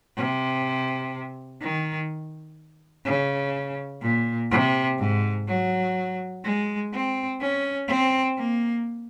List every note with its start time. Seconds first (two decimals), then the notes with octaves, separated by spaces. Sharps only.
0.17 C3
1.61 D#3
3.05 C#3
4.02 A#2
4.51 C3
4.98 G#2
5.48 F#3
6.44 G#3
6.93 C4
7.40 C#4
7.88 C4
8.37 A#3